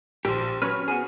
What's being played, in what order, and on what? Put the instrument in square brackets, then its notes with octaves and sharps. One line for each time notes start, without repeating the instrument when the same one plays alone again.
[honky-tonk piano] A#1 [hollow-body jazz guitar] G4 C5
[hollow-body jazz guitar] F#3 C#4 B4 [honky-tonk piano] C#6 F6
[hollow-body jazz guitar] B3 F#4 G#4